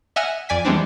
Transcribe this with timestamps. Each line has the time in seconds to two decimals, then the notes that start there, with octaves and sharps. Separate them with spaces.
0.16 D#5 E5 F#5 G#5 F6 F#6
0.49 F2 D5 G#5 B6
0.65 E3 G3 G#3 B3 C4 D4